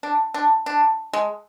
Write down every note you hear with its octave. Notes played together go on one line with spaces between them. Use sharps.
D4
D4
D4
G#3